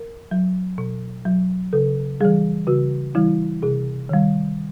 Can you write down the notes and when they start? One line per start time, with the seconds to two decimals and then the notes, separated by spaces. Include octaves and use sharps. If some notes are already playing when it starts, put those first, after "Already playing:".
Already playing: A#4
0.31 F#3
0.78 B2
1.25 F#3
1.73 C#3 A4
2.20 E3 G3 G#4
2.67 C#3 F#4
3.15 E3 G3 E4
3.62 C3 G#4
4.09 D#3 G3